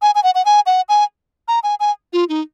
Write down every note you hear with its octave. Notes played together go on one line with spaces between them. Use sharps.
G#5
G#5
F#5
F#5
G#5
F#5
G#5
A#5
G#5
G#5
F4
D#4